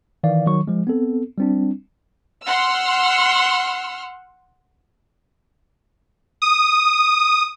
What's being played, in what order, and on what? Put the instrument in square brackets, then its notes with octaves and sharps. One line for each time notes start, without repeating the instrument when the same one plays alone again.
[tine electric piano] D#3 E3 D5 F5
D#3 F#3 C#6
F3 G#3
B3 C4 A4
G3 C4 D4
[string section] F#5 C6 E6 F6
[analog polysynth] D#6